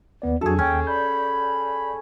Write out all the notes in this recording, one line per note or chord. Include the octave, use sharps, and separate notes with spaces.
D#2 B3 D5
F2 F#3 D4 F#4 G#4 A4
D#2 C#4 G5
D5 B5 G6